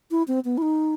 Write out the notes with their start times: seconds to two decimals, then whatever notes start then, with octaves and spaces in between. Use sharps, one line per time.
0.11 E4
0.28 C4
0.45 B3
0.58 E4
0.62 D#4